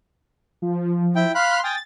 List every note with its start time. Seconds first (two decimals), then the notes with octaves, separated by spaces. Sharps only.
0.62 F3
1.16 E4 G5
1.35 F5 B5 C6 F6 F#6
1.64 G5 G#5 D#6 A6